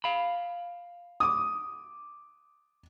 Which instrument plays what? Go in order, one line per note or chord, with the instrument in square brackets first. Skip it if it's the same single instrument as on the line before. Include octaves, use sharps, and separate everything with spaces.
[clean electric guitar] F5 B5
[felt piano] D6 D#6